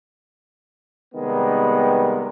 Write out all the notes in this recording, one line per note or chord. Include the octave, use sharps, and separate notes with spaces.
C3 D#3 G3 G#3 B3